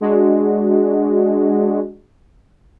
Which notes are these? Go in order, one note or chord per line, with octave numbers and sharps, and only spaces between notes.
G#3 D4 F#4